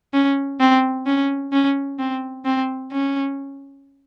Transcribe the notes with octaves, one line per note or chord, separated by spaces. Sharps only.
C#4
C4
C#4
C#4
C4
C4
C#4